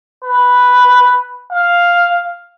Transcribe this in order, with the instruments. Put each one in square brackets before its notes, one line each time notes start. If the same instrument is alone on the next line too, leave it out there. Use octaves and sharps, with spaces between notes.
[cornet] B4
F5